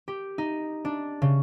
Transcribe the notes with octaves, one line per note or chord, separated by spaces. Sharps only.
G4
D#4
D4
C#3